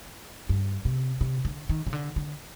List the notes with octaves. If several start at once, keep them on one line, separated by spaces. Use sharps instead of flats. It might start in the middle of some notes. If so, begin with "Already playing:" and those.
G2
C3
C3
D3
D#3
C#3
D3
D3